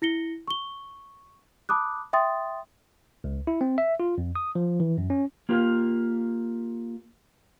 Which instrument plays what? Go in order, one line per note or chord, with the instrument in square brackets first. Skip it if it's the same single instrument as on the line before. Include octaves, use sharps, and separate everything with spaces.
[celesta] E4 A#6 C#7 G7
C#6 G7
A5 B5 D6 D#6 F#6
E5 G5 C6 D#6 A6
[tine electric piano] C#2
E4
C4
E5
F4
F2
D#6
F3
E3
F#2
C#4
[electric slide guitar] A#3 F4 G4 A#4